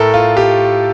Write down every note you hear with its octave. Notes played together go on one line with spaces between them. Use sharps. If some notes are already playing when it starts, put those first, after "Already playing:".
Already playing: A2 A3 A4 A#4
F4
G4